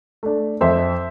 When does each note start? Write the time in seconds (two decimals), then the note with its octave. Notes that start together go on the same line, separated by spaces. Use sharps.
0.23 A3 D4
0.61 F2 C5 E5